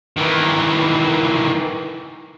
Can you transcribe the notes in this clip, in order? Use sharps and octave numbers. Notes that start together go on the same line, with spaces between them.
D#3 E3